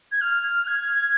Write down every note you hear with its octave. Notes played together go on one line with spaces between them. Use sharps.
G#6
F6
G#6